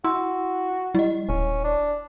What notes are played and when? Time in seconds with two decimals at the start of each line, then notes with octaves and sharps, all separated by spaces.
0.04 E4 F#4 C6 E6
0.95 G3 E4 D#5
1.29 D#1 C#4
1.64 D4